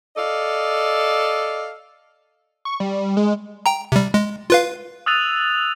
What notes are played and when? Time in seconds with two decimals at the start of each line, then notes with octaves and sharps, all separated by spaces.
0.17 A4 D5 D#5 F5
2.65 C#6
2.80 G3
3.17 G#3
3.66 G5 A#5
3.92 C3 G3
4.14 G#3
4.50 F4 B4 F5
5.06 D#6 E6 F#6 A6 D#7 F7